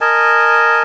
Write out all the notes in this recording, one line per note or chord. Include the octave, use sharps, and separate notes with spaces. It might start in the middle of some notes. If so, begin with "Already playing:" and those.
A#4 D#5 G#5 A5